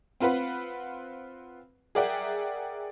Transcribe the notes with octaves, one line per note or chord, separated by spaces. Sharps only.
C4 F4 B4 F#5 B5
G#4 A#4 D5 E5 F#5 G5